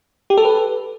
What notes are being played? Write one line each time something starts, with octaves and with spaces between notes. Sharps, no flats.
G4
A4
B4